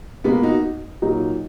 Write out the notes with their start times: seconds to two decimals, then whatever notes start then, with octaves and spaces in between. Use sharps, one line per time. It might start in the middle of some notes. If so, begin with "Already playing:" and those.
0.24 B2 G#3 A#3 B3 F4
0.43 D#4 F#4
1.02 A#2 F#3 A#3 D#4